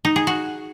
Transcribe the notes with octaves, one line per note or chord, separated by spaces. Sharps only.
D#4
G#4
F#4